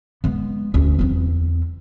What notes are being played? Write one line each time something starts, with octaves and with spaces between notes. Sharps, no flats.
G#3 B3
D2 C#4
E2 C4